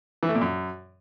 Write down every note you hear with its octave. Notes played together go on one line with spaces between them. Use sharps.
E3
A3
A#2
F#2